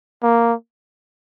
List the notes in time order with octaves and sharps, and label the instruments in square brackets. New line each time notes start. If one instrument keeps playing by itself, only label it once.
[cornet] A#3